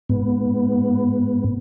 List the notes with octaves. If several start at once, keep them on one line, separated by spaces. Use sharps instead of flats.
G#2 B3